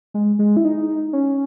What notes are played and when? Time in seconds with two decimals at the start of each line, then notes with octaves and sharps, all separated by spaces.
0.14 G#3
0.39 G#3
0.57 E4
0.64 D#4
1.13 C#4